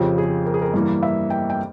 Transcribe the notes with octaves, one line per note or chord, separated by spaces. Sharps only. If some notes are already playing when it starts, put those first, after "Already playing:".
Already playing: F2 C#3 F3 C4 G4
G#4
A#4
G#4
A#4
G2 E3 A#3
E5
G5
G5